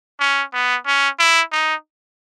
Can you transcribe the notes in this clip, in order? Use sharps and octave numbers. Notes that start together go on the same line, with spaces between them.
C#4
B3
C#4
E4
D#4